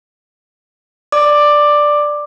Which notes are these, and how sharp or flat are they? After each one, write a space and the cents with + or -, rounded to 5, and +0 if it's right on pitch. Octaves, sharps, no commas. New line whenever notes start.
D5 +5 D6 +10